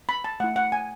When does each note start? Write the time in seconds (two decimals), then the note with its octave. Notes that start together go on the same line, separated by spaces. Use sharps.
0.09 B5
0.24 A5
0.40 A3 F#5
0.44 E4
0.56 F#5
0.72 G#5